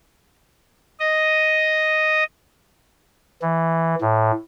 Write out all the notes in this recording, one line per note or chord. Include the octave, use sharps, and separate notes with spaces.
D#5
E3
A2